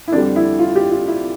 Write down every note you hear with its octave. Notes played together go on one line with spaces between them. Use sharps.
E4
F2 D3 G3 D4
E4
F4
G4
F4
E4